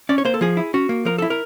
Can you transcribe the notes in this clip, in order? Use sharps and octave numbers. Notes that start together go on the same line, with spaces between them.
C#4 D5
C#5
A#3 C5
A4
F3 G#4
E4
C#4 F#4
A#3
F3 A#4
E4 A4
A#4